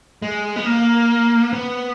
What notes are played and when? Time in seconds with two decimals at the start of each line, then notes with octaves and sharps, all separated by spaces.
0.22 G#3
0.56 B3
0.66 A#3
1.53 B3